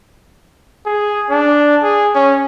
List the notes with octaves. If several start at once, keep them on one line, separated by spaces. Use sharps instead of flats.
G#4
D4
G#4
C#4